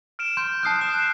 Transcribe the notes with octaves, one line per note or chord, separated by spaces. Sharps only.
F6 D7 E7
C6 G6
A5 D#6 F6 F#6 C7
F#6 E7